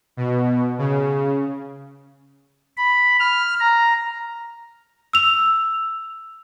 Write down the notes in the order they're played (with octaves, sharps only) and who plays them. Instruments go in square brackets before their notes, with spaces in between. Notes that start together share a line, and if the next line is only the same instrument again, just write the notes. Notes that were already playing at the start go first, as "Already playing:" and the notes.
[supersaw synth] B2
C#3
[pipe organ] B5
F6
A#5
[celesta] E6 F7